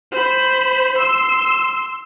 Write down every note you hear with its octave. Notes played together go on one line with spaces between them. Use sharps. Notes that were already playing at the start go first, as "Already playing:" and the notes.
C5 B5
C6 E6